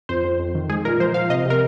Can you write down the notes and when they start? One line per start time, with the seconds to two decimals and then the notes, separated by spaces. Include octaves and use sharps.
0.09 F2 C5
0.24 F2
0.40 F2
0.55 D#3
0.70 G#3 G#4
0.85 A#2 A#4
1.00 F3 C5
1.14 F3 F5
1.29 C3 D#5
1.46 C3 A#4